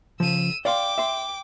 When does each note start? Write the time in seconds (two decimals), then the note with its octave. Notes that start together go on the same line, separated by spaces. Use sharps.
0.20 C#3 F3 E6 D#7
0.65 D5 F5 G5 C6 D6
0.98 E5 C6